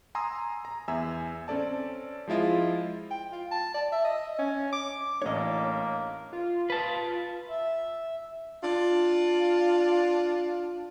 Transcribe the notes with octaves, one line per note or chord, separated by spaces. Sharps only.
G#5 A#5 C6 D#6 E6
A#5
E2 E5 G#5 E6
C4 C#4 A4 D5 A5
F3 G#3 E4 F4 D#5
G5
F4
A5
D5
E5
D#5
C#4
D6
A1 A3 A#3 D4 C#5 D#5
F4
B4 A5
E5
D4 F4